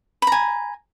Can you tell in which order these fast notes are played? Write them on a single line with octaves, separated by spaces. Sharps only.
B5 A#5 G#5